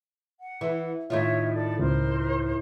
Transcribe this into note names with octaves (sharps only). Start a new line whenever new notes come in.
F#5
E3
A2 D#3 F4 C#5 E5
A4 D5
C#2 A#4 C5 C6